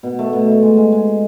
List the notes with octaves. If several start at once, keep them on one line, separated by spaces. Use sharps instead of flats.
B2
A3
B2
A3
G#3
G#3
G#3